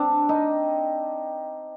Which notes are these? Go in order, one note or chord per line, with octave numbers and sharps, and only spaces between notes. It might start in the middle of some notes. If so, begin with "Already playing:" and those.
Already playing: C4 D4
D#4